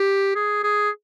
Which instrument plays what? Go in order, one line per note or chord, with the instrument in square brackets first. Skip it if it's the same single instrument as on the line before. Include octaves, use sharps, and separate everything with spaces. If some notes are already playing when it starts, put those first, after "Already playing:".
Already playing: [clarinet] G4
G#4
G#4